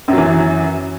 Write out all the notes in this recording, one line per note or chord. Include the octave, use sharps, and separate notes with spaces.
F#2 E3 F#3